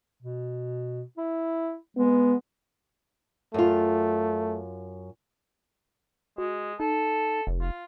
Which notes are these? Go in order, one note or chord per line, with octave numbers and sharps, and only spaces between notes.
B2
E4
G#3 B3
F#2 A3 F4
G#3 F#4
D#4 A4
F1
F4